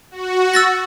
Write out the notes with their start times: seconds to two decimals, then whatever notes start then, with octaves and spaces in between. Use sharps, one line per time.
0.11 F#4
0.54 E6 A6 A#6